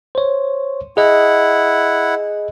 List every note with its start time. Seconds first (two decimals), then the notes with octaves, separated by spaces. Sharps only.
0.15 C5 C#5
0.97 E4 G#4 D#5 F#5